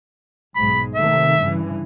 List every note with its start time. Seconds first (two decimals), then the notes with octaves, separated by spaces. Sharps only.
0.56 B1 G#2 G#3 B5
0.95 C3 D#3 A3 E5
1.40 G2 C#3 E3